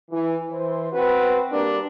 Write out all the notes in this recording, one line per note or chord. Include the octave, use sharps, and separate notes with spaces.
E3
E3 C5
C4 F#4 B4
G3 A#3 D4 A#4 D5